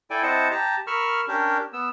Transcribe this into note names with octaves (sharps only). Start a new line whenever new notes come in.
E4 A4 D5 G5 G#5
C4 E4 C5 D#5 F#5 A5
G4 A5 A#5
A#4 B5 C#6 E6 F6
C#4 D4 G4 A#4
B3 E6